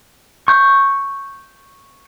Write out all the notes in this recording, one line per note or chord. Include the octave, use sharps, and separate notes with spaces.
C#6 G6